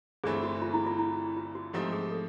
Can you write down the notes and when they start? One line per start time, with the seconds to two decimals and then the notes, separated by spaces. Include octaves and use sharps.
0.24 G1 G2 E3 A3 C4 G#4
0.43 F#4
0.62 F4
0.74 E4
0.86 F4
0.99 E4
1.37 F4
1.55 F#4
1.73 G#2 F3 A3 C4 D#4 G4
1.93 G#4
2.11 A4